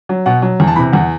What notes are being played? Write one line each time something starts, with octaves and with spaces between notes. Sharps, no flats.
F#3
B2 F#5
F#3
E2
A5
C3 E3 B5
E2 F#5